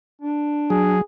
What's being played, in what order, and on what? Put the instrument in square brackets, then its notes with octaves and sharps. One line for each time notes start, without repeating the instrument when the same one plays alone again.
[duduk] D4
[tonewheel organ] F#3 [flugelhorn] G#4